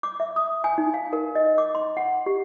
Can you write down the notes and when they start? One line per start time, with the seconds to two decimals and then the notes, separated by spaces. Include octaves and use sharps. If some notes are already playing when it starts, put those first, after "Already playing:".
0.03 D6
0.20 E5
0.36 D#6
0.64 G#5
0.78 D#4
0.94 F5
1.13 A#4
1.35 D#5
1.58 D6
1.75 C6
1.97 F#5
2.26 G4